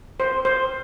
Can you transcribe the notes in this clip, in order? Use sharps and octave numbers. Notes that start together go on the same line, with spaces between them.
C5
C5